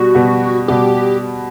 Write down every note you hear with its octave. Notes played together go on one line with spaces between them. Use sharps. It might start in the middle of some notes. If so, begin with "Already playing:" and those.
Already playing: B2 G3 B3 F#4
B2 G3 B3
B2 G3 B3 G4